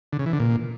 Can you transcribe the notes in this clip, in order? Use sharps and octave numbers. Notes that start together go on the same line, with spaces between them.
D3
C#3
E3
D3
A#2